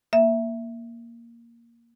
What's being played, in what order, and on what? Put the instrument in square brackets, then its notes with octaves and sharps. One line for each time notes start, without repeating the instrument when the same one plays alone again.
[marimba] A#3 E5